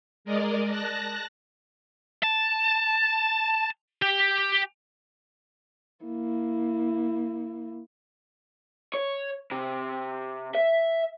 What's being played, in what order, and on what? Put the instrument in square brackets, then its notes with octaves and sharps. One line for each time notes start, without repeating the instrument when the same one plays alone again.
[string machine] G#3 A#4 D5 D#5
A5 F#6 A#6
[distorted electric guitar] A5
G4
[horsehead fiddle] A#3 E4
[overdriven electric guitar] C#5
C3
E5